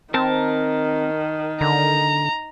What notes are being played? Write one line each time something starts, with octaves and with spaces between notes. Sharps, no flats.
D#3 C4 A#4 A5
D3 A#5